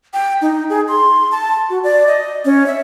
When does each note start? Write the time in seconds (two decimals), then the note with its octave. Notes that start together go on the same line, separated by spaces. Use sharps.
0.14 G5
0.42 D#4
0.70 G#4
0.88 C6
1.32 A5
1.70 F#4
1.84 D5
2.07 D#5
2.45 C#4
2.66 E5